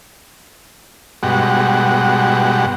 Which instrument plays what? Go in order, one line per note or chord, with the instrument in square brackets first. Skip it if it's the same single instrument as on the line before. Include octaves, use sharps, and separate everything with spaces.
[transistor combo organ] G2 B2 G#3 F#4 G4 F#5